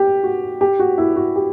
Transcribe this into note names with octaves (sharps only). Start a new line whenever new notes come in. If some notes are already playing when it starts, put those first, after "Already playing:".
Already playing: G4
F#4
G4
F#4
E4
F#4
G4